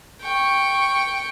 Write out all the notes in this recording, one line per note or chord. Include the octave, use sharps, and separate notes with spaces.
G5 C#6